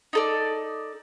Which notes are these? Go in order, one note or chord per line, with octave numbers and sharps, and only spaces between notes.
D#4 A4 D5